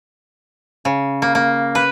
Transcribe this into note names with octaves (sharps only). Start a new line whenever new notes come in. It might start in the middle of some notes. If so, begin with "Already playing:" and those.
C#3
A#3
A#3
B4